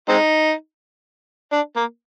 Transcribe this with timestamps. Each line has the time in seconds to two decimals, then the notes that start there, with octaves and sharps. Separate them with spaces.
0.09 G#3 C4 D#4
1.52 D4
1.76 A#3